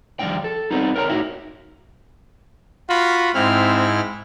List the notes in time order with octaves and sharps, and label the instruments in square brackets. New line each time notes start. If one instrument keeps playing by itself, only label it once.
[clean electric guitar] D#2 F3 G3 A#3 D4 G5
A4
G3 B3 C4 D#4
A#4 C#5 G5 A#5
A2 D#4 F#4 E5
[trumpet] F4 [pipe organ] F#4 B5
[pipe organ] G#2 E4 F6 [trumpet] C4